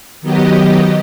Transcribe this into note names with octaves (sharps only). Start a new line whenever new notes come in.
D#3 F#3 B3 G4 D#5